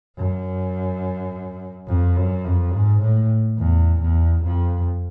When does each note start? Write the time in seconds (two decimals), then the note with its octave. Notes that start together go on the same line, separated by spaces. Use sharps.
0.17 F#2
1.88 F2
2.16 F#2
2.44 F2
2.73 G#2
3.01 A2
3.59 E2
4.01 E2
4.44 F2